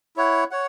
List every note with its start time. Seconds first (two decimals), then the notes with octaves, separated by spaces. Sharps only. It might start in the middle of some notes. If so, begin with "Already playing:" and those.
0.16 E4 C#5 F#5
0.51 C#5 F#5